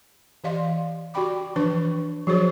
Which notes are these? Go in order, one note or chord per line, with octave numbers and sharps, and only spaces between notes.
E3 G4 D5 D#5 F5 C6
F#4 G4 D5 G5 B5 D6
E3 F3 D4 B4 C#6
F3 F#3 F#4 G#4 C5 C#5